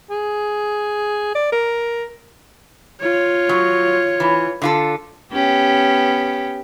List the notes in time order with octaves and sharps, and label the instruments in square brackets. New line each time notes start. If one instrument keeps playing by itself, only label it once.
[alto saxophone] G#4
D5
A#4
[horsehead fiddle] F4 C#5
[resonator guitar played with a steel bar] F#3
E3
D3 F4 A4
[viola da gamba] B3 C#4 G4